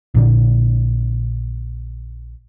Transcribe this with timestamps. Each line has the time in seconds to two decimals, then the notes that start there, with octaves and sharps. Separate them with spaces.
0.14 A#1 A#2 D3